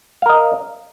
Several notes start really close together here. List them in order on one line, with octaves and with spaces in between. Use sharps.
F5 A#4 D#5